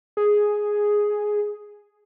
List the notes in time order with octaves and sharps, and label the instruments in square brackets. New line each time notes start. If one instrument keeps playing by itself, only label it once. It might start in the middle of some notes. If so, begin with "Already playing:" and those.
[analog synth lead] G#4